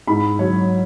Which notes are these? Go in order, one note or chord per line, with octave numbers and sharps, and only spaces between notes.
G#2 B5
F#3 C#5